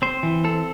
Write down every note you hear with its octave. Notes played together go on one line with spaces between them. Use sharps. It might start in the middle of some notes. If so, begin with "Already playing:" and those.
C4 C5
E3
C4 A4